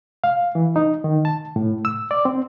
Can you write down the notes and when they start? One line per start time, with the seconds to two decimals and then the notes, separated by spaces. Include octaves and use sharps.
0.24 F5
0.55 E3
0.76 D#4
1.04 D#3
1.25 A5
1.56 A2
1.85 E6
2.11 D5
2.25 C4